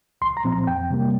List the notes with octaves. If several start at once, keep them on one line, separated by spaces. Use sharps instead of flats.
C2 C6
A#5
A#2 F3 C4
A#5
F2 G5
C3 G3 A#3